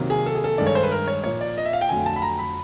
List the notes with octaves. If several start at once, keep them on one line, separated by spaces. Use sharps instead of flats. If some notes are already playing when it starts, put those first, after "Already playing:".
Already playing: C3 D#3 F#3 A#3
G#4
A4
G#4
A4
G2 D#3 G#3 D5
C#5
C5
B4
A#4
C#5
A#2 F3 A#3 C#5
D5
D#5
E5
F5
G5
F2 D3 F#3 A3 G#5
A5
B5
A#5
B5